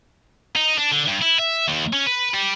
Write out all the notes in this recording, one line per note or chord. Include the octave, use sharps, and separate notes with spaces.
D#4
D4
D3
G2
E4
E5
D#2
C#4
B4
G3